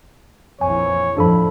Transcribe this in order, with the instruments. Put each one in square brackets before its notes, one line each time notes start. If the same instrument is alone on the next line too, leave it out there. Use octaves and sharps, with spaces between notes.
[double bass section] A#1 F2 E3 [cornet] C#5 [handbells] G#5
[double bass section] F2 A2 [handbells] D4 A4 B5